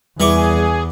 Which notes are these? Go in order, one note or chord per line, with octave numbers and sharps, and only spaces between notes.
E2 E3 G3 G#4 C#6 D6